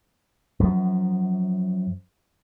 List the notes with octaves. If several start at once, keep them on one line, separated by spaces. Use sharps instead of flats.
F#2 F3